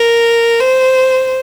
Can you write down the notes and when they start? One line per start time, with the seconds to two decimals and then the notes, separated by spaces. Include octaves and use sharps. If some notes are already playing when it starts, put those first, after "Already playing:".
Already playing: A#4
0.60 C5